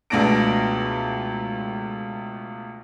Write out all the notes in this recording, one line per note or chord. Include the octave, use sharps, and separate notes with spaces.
C#2 B2 A3 D4 A#6 D7